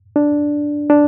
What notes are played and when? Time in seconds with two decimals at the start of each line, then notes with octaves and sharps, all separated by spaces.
0.16 D4
0.90 D4